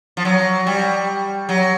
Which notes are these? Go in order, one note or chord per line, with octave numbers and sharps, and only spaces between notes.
F3
F#3
G3
F#3